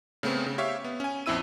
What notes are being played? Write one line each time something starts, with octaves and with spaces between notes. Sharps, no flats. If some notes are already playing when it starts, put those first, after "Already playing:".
C#3 A3 B3 C4
C#3
G4 C#5 E5 F5
B3
C#4 G#5
A#1 F2 C4 E4 E6 D#7